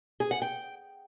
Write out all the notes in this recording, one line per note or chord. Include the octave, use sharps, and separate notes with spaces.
G#4
F#5
G5